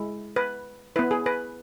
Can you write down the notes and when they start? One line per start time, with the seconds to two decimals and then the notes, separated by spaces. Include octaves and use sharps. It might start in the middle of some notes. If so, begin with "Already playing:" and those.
Already playing: G#3 E4
0.36 B4
0.96 B3 E4 B4
1.11 G#4
1.26 B4